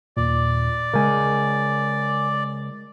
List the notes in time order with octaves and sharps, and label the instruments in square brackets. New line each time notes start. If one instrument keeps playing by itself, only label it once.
[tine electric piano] D#2 A#2 [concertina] D5
[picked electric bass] C#3 G#3 [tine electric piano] A#4 G#5